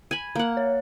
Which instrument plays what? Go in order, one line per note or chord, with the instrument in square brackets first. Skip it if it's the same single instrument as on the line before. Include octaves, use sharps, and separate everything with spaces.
[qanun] G#5 B5
A#3 F#5
[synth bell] C#5